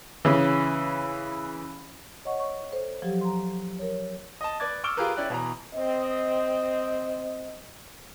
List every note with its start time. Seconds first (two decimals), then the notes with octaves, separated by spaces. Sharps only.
0.25 C#3 E3
2.25 C#5 D#5 F#5 C#6
2.40 C#6
2.72 A4 C5
3.02 F3 F#3 G4
3.21 A#5 C6
3.79 A#4 C#5
4.41 D#5 A5
4.60 B4 D5 D6 G#6 A6
4.84 C#6 D6 E6 F6 D7 G7
4.97 F4 G4 G#4 A#4 B4
5.16 C#4 E4 D5 G5 F#6
5.30 B2 E3 A#5
5.74 C4 D#5